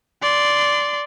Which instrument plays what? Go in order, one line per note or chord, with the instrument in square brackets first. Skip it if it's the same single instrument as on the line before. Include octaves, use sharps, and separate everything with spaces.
[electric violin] D5 C6